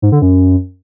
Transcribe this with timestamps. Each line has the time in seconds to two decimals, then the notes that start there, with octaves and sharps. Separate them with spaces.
0.02 G#2
0.12 D3
0.22 F#2